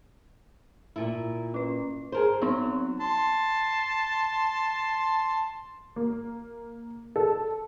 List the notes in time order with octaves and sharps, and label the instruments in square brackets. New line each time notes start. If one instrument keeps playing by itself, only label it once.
[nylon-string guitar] A#2 E4
[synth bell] C#4 B4
[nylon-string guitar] G#4 A#4 C5
[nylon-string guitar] F#3 [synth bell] B3 C4 D#4
[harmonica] A5 C6
[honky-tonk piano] A#3
A4